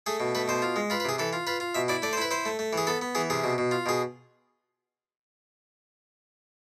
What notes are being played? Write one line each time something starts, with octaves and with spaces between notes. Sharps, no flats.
A3 G#4
B2
A3 B4
B2 C5
F4
G#3
F4 B4
B4
C3 G#4
E3 A4
F4
F4 B4
F4
B2 E5
E4 D5
A3 D5
C5
E4 B4
E4 C5
A3
A3
E3 G#4
B3 A4
B3
E3 G#4
C3 G#4
B2
B2
F4
B2 G#4